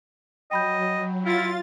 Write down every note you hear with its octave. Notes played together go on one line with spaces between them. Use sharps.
F#3 D#5 G5 B5 G6
E4 F4 A6